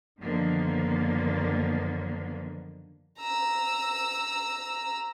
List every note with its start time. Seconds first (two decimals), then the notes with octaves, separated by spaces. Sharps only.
0.18 F#2 D3 D#3 F3 A#3 B3
3.19 A#5 E6